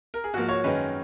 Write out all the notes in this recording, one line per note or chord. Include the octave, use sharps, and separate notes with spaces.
A#4
G#4
G#2 F3 A#3 F#4
C#5
F#2 D#3 G#3 C#4 B4